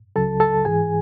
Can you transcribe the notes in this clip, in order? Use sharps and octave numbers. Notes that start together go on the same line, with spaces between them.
C#2 C#3 F#3 A4 A5
A4 A5
G#2 E3 G#4 G#5